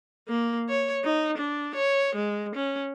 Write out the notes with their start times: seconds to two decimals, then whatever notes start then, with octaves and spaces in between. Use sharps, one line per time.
0.28 A#3
0.69 C#5
1.04 D#4
1.38 D4
1.75 C#5
2.15 G#3
2.55 C#4